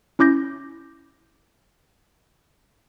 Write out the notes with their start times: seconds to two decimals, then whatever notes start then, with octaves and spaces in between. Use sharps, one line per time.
0.19 C#4 E4 D6 G6 A#6